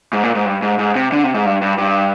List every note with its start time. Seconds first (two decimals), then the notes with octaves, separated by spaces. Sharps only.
0.13 G#2
0.23 A#2
0.35 G#2
0.46 G2
0.62 G#2
0.79 G#2
0.95 C3
1.12 D3
1.24 C3
1.35 G#2
1.46 G2
1.62 G2
1.78 G2